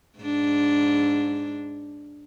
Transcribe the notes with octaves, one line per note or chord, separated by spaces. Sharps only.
G#2 D4